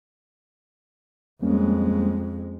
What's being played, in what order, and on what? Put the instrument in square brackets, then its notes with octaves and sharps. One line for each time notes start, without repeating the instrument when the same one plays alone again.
[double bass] F2 G#3 [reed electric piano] G3 A#3 C#4